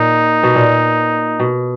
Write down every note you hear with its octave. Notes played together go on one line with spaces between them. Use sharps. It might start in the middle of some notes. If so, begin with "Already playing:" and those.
Already playing: A#2 D#4
B2
A#2
B2